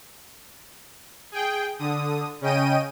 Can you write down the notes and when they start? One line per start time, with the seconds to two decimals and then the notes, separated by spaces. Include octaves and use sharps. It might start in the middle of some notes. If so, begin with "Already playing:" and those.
1.32 G#4 G5
1.79 D3 D#6
2.41 C#3 C#4 D#5 G5 D#7